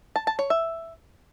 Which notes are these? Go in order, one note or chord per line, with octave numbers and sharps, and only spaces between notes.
A5
A5
C#5
E5